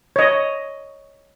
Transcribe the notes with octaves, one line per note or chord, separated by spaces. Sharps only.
C#5 D#5